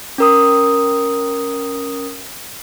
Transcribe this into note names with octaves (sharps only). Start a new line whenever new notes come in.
C#4 A#4 D#6